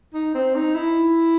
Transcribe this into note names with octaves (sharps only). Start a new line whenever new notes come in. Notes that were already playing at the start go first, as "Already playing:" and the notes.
D#4
C4
D#4
E4